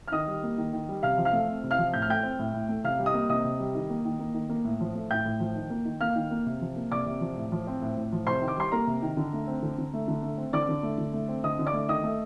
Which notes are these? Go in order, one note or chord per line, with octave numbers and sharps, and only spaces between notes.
F6
D#3 D#5 D#6
G3
A#3
D#3
D#3
G3
C3 F5 F6
F3
F5 F6
A3
C4
C3
F5 F6
F3
A2 G6
F6
A3 G5 G6
C4
A2
A2
A3
C3 F5 F6
G3
D#5 D#6
A#3
C3 D#5 D#6
C3
G3
D#3
A#3
D#3
A#3
D#3
A#3
A2
F3
A3
A2 G5 G6
A2
F3
D#3
A#3
D#3
A#3 F5 F6
D#3
A#3
C3
F3
A#3
C3 D5 D6
C3
F3
A2
F3
C4
A2
A2
F3
C3 C5 C6
D#3
D6
G3 C6
A#3 A#4 A#5
C3
D#3
D3
A3
C4
D3
D3
A3
D3
A3
C4
D3 D5 D6
D3
A3
D3
A3
C4
D3 D#5 D#6
D3
D5 D6
A3
D#3 D#5 D#6
A3